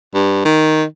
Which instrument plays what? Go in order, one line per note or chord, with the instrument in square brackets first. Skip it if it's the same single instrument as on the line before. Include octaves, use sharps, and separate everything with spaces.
[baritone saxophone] G2
D#3